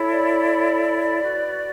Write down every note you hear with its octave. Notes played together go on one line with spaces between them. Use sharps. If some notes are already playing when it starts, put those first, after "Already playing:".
Already playing: E4 A4 C#5
D5
F#4 B4